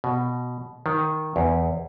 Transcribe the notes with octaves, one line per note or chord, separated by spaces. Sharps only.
B2
D#3
E2